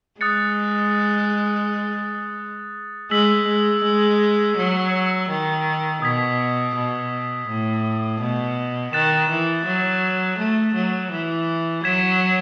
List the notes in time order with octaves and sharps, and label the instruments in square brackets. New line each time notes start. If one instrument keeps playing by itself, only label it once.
[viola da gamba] G#3 [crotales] D#6 F#6 A6 C#7
[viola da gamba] G#3 [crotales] E6 B6 F#7
[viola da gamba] G#3
G#3
F#3
D#3
[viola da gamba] B2 [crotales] D#6 G#6 B6
[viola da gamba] B2
A2
B2
[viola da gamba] D#3 [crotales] F#6 A6 E7
[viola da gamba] E3
F#3
A3
F#3
E3
[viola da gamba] F#3 [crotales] G#6 B6 E7